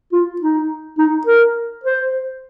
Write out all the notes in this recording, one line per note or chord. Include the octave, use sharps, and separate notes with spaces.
F4
D#4
D#4
A#4
C5